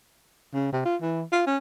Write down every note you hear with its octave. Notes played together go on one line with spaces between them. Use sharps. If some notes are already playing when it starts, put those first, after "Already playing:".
C#3
C3
F4
E3
F4
C#4